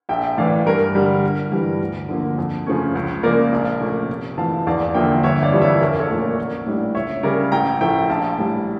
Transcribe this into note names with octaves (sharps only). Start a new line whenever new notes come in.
A#1 E5 G5
A2 E3 D5 F5
G2 A#4
D3 G3
G1
G2 E3 G3
D2
D3 F3 A#3
F2
C#3 F3 A3 C#4
C#2
C#3 F3 A#3 A#4 D5
A#1
A#2 A3 C#4
F1
F2 E3 F5 A5
E2 D5 F5
D3 F3 A#3 E5 G5
G1 C#5 E5
D5 F5
F2 E3 G3 D4
C#5 E5
A#1 A#4
A4 C#5
A#2 F3 A3
A#4 D5
A1
A2 G3 D4
C#2 C#5 E5
C#3 G3 A#4 D5
A1 G5 A#5
A2 F3 A3 E5 G5
A#1 F5 A5
A2 G3